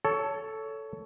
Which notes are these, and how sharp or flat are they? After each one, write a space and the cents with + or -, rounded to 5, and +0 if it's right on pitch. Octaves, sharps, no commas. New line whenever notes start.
A4 +0 C#5 +20